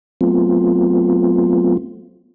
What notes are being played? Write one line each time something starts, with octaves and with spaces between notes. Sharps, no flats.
F#3 A3 B3 C4 F4